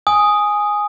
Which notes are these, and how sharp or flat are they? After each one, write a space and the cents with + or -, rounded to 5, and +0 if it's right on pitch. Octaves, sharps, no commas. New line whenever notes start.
G#5 +0 D#6 +0